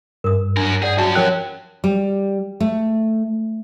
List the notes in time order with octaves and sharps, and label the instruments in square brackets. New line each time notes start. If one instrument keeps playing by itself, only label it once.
[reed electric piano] G2 [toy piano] A#4 D#6
[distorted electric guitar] F#3 A#4 [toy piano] D4
[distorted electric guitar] G#4 [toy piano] D5 F#5
[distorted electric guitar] F#2 C#4 [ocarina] F#4 [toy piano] E5 A5 C#6
[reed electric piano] F3 F#6 [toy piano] G4 A#4 G5 [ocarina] C#5
[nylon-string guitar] G3
A3